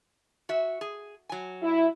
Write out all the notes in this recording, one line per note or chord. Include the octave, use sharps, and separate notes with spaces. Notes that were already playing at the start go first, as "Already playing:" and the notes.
F#4 E5
G#4
F#3 G#5
E4